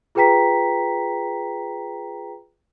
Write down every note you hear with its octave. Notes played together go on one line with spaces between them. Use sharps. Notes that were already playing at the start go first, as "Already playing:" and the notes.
F4 G#4 B4 G5 A#5 B6